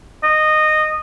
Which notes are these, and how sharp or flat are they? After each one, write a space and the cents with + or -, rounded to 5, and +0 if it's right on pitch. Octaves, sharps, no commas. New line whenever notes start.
D#5 -15